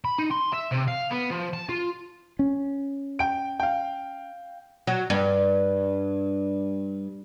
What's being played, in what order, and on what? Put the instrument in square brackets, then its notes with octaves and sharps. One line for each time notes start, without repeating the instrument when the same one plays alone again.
[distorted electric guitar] B5
D#4
C6
E5
C3
F5
B3
F3
A5
F4
[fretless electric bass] C#4
[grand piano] G5 D7
F5 G5
[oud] F#3
G2